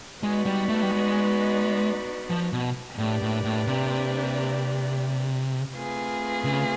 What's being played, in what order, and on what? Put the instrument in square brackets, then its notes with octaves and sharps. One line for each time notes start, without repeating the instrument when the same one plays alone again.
[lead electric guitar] G#3 [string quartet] B3 D#4 F#4 B4 D5
[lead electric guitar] G3
A3
G3
G#3
F3
B2
[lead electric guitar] A2 [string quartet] A#3 D4 G4 B4 D5
[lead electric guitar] A2
A2
C3
[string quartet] A3 C4 F4 G#4 B4
[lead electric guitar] C#3